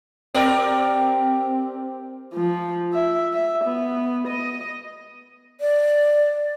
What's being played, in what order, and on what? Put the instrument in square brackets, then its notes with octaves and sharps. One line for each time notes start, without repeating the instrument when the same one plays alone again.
[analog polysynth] C4 [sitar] G4 A#4 D5
[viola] F3
E5
E5
B3
D#5
[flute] D5